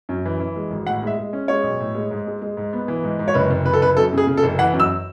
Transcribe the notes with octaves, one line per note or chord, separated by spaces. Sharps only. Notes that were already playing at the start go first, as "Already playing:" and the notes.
F#2
E3
E3
G#3
G#1
A2 F#5
G#3 E5
G#3
C#4
G#3 C#5
B1
A2
G#3
G#2
G#3
G#3
G#2
B3
E3
G#2
G#2
C#5
F#1 B4
F#1
F#1 B4
A4
F#1 B4
F#2 A4
C#3 G#4
C#3
A4
F#1
E3 F#5
F#2
E6